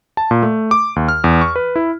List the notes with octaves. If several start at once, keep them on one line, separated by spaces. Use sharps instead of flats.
A5
A#2
A3
D6
D#2
F6
E2
C#6
B4
E4